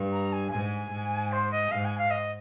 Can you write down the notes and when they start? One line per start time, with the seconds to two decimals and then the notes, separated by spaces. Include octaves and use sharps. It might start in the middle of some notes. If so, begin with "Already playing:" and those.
Already playing: G2
0.12 A#5
0.33 G#5
0.52 G#2 G#5
0.92 G#2
1.32 C5
1.51 D#5
1.71 G#2 F5
1.85 G#5
1.98 F5
2.11 D#5